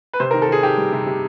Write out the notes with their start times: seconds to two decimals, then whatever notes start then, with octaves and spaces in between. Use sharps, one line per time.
0.13 B4
0.20 C3 C5
0.31 D#3 A#4
0.42 A4
0.49 D#3 G#4
0.63 D#3 G4
0.77 G3
0.92 C3
1.06 C3